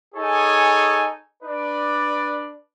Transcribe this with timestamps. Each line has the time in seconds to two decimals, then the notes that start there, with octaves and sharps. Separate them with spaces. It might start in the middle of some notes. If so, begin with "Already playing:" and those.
0.15 D#4 G#4 A4 C#5 G#5
1.43 D4 B4 D5